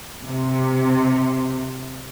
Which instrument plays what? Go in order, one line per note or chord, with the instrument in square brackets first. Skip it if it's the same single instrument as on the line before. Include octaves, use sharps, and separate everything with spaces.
[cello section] C3